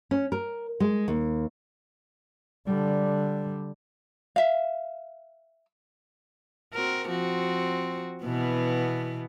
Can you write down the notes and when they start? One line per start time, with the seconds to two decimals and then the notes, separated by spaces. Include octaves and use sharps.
0.11 C#4
0.32 A#4
0.80 G#3
1.08 D#2
2.67 D3 G3
4.36 E5 F5
6.74 C4 F#4 A#4
7.09 F3 C4 F#4
8.24 B2 E3 B3